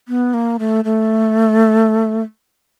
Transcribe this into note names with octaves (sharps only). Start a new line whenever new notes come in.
B3
A#3
A3
A3